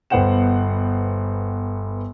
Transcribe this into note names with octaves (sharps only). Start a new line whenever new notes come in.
G1 B3 C5 F#5 G5 E7